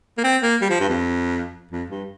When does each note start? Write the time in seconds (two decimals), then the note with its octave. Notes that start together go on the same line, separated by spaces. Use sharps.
0.18 A#3
0.24 C4
0.43 A#3
0.61 G3
0.70 F3
0.80 G2
0.89 F2
1.71 F2
1.90 G2